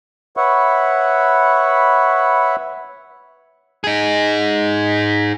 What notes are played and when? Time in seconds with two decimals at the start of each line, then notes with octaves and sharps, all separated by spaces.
0.37 B4 C#5 E5 F#5 B5 C#6
3.84 D#4 G#4